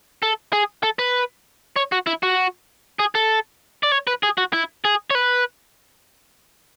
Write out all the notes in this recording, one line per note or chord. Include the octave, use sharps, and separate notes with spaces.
A4
G#4
A4
B4
C#5
F#4
E4
F#4
G#4
A4
D5
C#5
B4
G#4
F#4
E4
G#4
C#5
B4